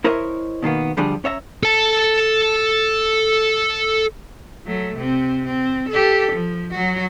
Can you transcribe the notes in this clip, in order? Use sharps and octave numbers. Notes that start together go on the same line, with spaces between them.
E4 A#4 C5 C#5 D#5 E5
B2 D#3 A#3 B3
D3 F3 G3 D4 G#4
C#4 C#5 E5 A#5
A4 A5
F#3 A3
C3 C4
C4
G4 A4
F3
F#3 F#4